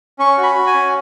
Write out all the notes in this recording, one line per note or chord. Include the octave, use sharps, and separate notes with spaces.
C#4 C#6
F#4
B5
F#4
G#5
C#4